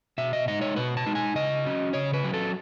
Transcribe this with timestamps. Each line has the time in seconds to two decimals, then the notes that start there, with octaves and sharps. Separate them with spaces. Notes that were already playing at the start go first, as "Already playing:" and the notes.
0.18 B2 E5
0.33 D#5
0.48 G#3 D#4 D#5
0.61 C#5
0.76 B2 B4
0.97 A5
1.06 G#3 D#4
1.15 G#5
1.35 C#3 D#5
1.65 F#3 C#4
1.93 C#3 C#5
2.14 B4
2.24 F#3 C#4
2.33 A4